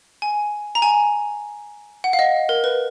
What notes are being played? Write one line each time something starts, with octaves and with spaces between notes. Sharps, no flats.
G#5
A#5
G#5
F#5
F5
D#5
A#4
B4